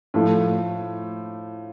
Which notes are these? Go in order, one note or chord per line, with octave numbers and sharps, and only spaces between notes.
A2 F3 A3